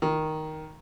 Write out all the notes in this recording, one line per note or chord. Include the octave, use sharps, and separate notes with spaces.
D#3